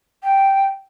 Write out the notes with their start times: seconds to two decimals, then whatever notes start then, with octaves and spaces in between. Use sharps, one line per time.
0.23 G5